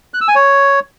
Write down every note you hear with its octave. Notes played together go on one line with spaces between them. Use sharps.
F#6
E6
G#5
C#5